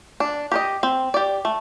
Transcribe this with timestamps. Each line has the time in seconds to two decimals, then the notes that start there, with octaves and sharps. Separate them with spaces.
0.20 D4
0.52 G4 A#4 D#5
0.83 C4
1.14 G4 D5
1.45 A3